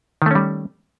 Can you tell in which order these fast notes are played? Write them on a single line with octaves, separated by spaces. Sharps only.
D#3 A3 C#4 G3